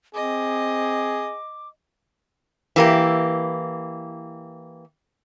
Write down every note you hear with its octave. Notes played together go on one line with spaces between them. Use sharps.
C4 G#4 D#5 D6
E3 A#3 G4